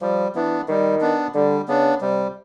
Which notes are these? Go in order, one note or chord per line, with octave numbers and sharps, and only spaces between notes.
F3 G3
E3 B3 D4
D#3 G3
B3 D4
D3 G3
C#3 B3 D4
C3 G3